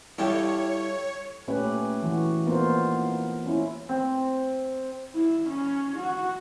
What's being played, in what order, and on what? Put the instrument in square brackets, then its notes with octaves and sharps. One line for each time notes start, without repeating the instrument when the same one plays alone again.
[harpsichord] G3 F4 A4 [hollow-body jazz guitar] E4 G4 [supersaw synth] C#5
[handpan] A#2 A3 C#4 G4 B4
E3 F#4
A#3 B3 D#4 F4 C5
C#4 E4
[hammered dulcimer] C4
[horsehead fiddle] E4
C#4
F#4